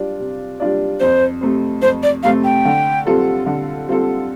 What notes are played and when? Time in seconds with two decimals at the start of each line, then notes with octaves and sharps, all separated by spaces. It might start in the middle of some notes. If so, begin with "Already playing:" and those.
Already playing: G3 D4 F4 D5
0.19 C3
0.60 G3 D4 F4 D5
1.00 F2 C5
1.41 C3 A3 C4
1.82 F2 C5
2.03 D5
2.23 C3 A3 C4 F5
2.44 G5
2.65 D3
3.06 G3 C4 F4 A4
3.46 D3
3.88 G3 C4 F4 A4